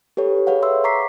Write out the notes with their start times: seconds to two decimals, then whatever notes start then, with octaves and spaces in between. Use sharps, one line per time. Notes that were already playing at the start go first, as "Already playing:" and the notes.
0.17 G4 A4 B4 C#5
0.47 G#4 A4 B4 C#5 F5 F#5
0.62 E5 C6 E6
0.84 A#5 C#6 D6 B6 C7